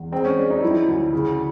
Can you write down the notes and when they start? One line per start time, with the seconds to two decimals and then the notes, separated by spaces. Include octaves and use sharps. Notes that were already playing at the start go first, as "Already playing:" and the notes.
Already playing: E2
0.12 G#3 C4
0.25 C#4
0.37 G#3 D4
0.50 D#4
0.62 F3 E4
0.88 D2
1.13 C#3